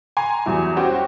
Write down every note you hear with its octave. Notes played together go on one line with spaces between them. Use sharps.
G#5 A#5 C6
E2 F#3 G3 E4
C#4 F#4 G4 C5